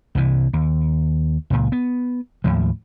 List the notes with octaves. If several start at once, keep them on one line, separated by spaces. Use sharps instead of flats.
C2 C3 E3
D#2
C#2 A#2
B3
D#2 A2 F3